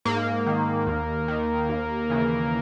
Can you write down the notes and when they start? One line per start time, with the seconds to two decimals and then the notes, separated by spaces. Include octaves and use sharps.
0.05 G#2 A#3
0.46 D#3
0.87 D#2
1.28 D#3
1.69 D#2
2.10 C#3 E3